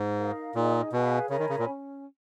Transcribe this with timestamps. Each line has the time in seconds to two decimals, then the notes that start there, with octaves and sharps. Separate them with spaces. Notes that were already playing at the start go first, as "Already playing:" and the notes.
Already playing: G#2
0.17 D#4 A#4 F5
0.55 A#2 D#4 G#4 D#5
0.93 B2 G#4 B4 F5 G#5
1.30 C#3 A#4 C#5 G#5 B5
1.39 D#3
1.49 C#3
1.59 A#2
1.67 C#4